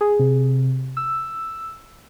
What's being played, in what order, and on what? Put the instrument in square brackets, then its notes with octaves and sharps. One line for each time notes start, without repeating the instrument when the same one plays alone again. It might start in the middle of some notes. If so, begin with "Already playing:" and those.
[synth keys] G#4
C3
E6